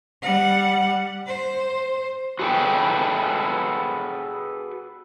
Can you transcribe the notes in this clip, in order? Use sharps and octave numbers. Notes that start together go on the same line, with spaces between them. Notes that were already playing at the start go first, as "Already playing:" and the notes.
G3 F#5
C5
F#4 G#4 A4 B4 G5